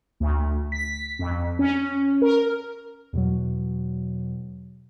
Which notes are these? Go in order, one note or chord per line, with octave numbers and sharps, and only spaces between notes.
D2
B6
F2
C#4
A#4
E2 B2 F#3